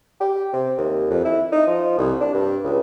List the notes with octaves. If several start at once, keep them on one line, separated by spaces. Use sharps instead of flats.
G4
C3
D#2
F2
E4
D#4
F3
C2
D4
G2
C#2